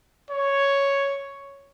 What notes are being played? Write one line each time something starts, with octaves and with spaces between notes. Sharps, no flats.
C#5